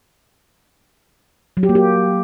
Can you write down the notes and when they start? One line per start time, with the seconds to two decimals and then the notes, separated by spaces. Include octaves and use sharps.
1.57 F#3
1.63 G4
1.69 A#3
1.75 G4